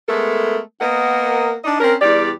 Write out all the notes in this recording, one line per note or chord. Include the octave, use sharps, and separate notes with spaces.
G#3 A3 B3 A4 A#4
A#3 B3 A#4 D#5 F#5
D4 D#4 D5 D#5
C4 C#4 A#4
E2 G3 G4 D5